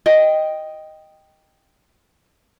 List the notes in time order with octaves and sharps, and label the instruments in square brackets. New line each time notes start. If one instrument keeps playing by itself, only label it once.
[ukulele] D#5 G5